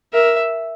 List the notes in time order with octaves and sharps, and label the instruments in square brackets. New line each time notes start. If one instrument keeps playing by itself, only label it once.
[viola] A#4 [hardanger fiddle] E5